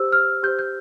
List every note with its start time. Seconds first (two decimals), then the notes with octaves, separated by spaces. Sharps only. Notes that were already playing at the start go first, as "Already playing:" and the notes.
Already playing: G4 C5 E6
0.12 F6
0.43 G4 C5 G6
0.59 G6